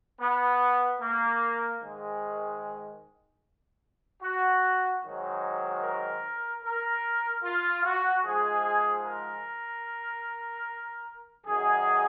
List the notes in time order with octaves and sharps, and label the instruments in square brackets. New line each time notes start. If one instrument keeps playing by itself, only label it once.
[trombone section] B3
A#3
G#2 D#3 G#3
F#4
G#2 D#3 F#3
A#4
A#4
F4
F#4
G#2 F3 G#3 G#4
A#4
F#2 D#3 F#3 G#4